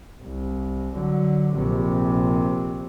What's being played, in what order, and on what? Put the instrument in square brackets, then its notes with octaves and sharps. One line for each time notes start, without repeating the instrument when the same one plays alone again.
[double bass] C2
D3 F#3
A#1 C3